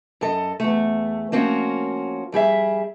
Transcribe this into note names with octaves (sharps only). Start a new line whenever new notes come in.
F#2 A4 D#5
E2 A3
F3 A#3 C4 C#4 F#4
F2 G3 G#4 E5